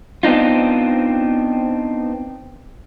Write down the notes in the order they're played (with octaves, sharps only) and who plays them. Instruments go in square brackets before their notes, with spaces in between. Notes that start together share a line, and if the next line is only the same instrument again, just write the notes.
[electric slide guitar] B3 C4 D4 D#4 F4